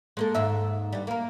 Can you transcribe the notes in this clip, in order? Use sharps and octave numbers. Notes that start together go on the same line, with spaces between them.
G#3 A#3 A4
D#2 G#2 E5
G2 G3
A#3 A#4